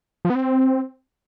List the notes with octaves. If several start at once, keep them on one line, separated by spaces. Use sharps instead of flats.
F3
B3
C4